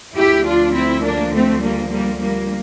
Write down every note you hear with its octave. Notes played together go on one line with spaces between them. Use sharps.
D2 D3 F3 E4 G4
D4 F4
C4 E4
A#3 D4
A3 C4
G3 A#3
G3 A#3
G3 A#3